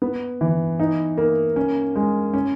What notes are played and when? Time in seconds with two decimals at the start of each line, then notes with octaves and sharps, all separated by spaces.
0.02 B3
0.41 E3
0.80 D#4
1.18 A#3
1.56 C#4
1.96 G#3
2.34 C#4